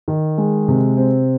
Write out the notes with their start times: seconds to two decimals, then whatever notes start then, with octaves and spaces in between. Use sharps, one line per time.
0.08 D#3
0.38 G#3
0.68 C3
0.97 C4